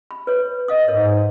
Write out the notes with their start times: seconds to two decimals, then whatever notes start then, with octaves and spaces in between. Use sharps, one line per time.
0.11 B5
0.27 B4 C#5
0.68 D#5 F5 D#6
0.88 G#2 A#4 C#5